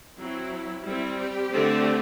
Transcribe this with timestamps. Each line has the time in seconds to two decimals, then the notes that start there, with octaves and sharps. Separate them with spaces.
0.19 F#3 C4 E4
0.85 G3 C4 E4
1.19 G4
1.51 D3 A3 C4